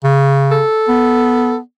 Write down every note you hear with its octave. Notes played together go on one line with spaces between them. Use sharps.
C#3
A4
B3